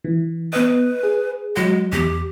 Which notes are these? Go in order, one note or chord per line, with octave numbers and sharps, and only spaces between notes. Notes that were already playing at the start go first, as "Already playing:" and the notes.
E3
B3 B4 D#5
G#4
F#3 G#3 F#5
E2 G4